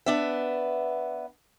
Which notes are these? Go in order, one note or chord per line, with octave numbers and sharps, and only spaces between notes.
B3 D4 E5